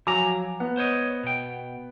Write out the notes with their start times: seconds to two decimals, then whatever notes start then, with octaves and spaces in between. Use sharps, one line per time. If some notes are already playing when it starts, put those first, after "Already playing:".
0.07 F3 F#3 G#5 A#5 D6
0.60 B3
0.77 C5 C#5 D#5
1.23 B2 G5